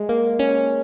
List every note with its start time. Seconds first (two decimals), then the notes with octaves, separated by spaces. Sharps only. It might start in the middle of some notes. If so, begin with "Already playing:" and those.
Already playing: G#3
0.09 A#3
0.39 C#4